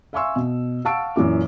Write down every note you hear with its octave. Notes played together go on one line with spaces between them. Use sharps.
E5 F5 G#5 C6 C#6 E6
B2
F5 F#5 A5 C#6 E6 D7
F#2 A#2 E3 D6